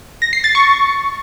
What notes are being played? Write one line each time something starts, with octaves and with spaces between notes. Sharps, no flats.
A#6
C7
A6
C#6